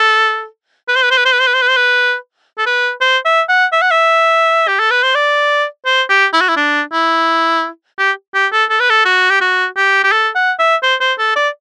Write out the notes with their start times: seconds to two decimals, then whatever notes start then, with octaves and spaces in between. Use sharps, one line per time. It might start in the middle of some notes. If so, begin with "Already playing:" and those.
Already playing: A4
0.88 B4
0.96 C5
1.03 B4
1.11 C5
1.18 B4
1.25 C5
1.33 B4
1.40 C5
1.47 B4
1.54 C5
1.62 B4
1.69 C5
1.77 B4
2.58 A4
2.66 B4
3.01 C5
3.25 E5
3.49 F#5
3.73 E5
3.82 F#5
3.91 E5
4.68 G4
4.80 A4
4.91 B4
5.03 C5
5.15 D5
5.86 C5
6.09 G4
6.33 E4
6.41 F#4
6.49 E4
6.57 D4
6.93 E4
7.99 G4
8.34 G4
8.52 A4
8.70 A4
8.80 B4
8.90 A4
9.05 F#4
9.30 G4
9.41 F#4
9.77 G4
10.04 G4
10.12 A4
10.35 F#5
10.59 E5
10.83 C5
11.01 C5
11.19 A4
11.36 D5